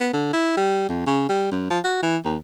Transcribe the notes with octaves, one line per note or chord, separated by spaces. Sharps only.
B3
D3
E4
G3
F2
C#3
G3
F#2
F3
F#4
E3
D#2